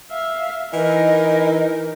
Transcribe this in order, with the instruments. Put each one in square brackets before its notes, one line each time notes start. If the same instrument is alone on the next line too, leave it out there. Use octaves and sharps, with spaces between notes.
[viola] E5 F5
[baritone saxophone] E3 [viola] D#4 A#4 [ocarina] D#5